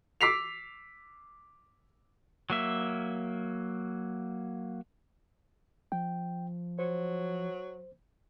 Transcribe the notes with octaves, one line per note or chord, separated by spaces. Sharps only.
D6 E6 B6 C7 F7
F#3 A#3 E5
F3 G5
F#3 C5